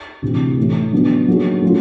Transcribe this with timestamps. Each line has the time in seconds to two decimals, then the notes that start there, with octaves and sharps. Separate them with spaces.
0.22 D2 C3 E3
0.58 A2 E3 A3
0.93 D3 F#3 B3 D4
1.28 D3 F#3 A#3 D#4 G#4
1.62 F#3 A3 C#4 F4